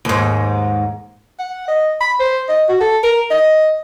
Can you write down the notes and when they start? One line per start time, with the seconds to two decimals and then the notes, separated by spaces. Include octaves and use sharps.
0.05 D#2 G#2
1.39 F#5
1.68 D#5
2.01 B5
2.19 C5
2.49 D#5
2.69 F#4
2.81 A4
3.03 A#4
3.31 D#5